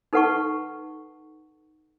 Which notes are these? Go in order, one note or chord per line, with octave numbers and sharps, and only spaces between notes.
D#4 A4 B4 F#5 A5 C#6